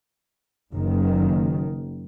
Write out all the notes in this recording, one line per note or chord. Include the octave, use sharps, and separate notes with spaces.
F#1 F#2 D#3